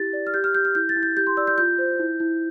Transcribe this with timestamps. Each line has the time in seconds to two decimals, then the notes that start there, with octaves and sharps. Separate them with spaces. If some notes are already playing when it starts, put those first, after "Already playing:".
Already playing: E4 G4 A6
0.13 D5
0.27 F6
0.34 G4 G6
0.44 F6
0.55 G4 G6
0.65 F6
0.75 E4 G6
0.89 A6
0.96 E4
1.03 G6
1.17 G4 G6
1.27 C6
1.37 D5 E6
1.47 G6
1.58 F4 G6
1.78 C5
1.99 E4
2.20 E4